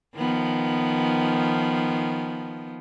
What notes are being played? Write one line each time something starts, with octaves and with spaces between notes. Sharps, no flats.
D#3 F3 B3